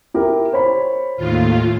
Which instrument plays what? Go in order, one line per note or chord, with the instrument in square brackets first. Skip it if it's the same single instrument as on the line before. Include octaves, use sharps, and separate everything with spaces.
[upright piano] E4 G4 A#4
C5 C#5 B5
[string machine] D#2 A2 F4